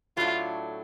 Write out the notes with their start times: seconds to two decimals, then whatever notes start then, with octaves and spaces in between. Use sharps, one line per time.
0.17 A2 F#3 A3 D4 F4